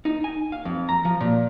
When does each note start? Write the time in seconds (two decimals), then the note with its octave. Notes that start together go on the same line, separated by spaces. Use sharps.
0.05 D#4
0.24 G#5
0.52 F5
0.65 F2
0.89 A#5
1.05 F3
1.20 A#2